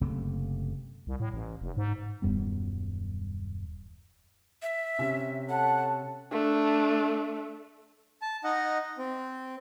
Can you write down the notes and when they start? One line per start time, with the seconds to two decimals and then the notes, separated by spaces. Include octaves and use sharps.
0.01 F#1 C3 A3
1.07 C2
1.20 A2
1.34 A1
1.61 F1
1.77 G#2
2.22 D#1 F#2 G3 B3
4.62 E5
4.99 C3 C#4
5.49 A4 C#5 F#5 A5
6.32 A3 D4
8.22 A5
8.44 D#4 D#5 F#5
8.98 C4